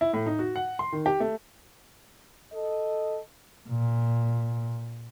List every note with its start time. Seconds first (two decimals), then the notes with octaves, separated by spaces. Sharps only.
0.01 E4
0.13 A2
0.26 D#4
0.39 F#4
0.56 F#5
0.79 C6
0.93 D#3
1.06 G4
1.20 A3
2.52 A4 D#5
3.69 A#2